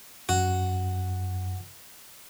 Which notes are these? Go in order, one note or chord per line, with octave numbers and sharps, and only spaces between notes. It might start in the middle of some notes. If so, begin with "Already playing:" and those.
F#2 F#4